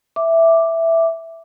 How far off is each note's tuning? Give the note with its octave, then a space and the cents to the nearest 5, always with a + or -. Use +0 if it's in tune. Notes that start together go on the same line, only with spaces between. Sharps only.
E5 +0 D6 +0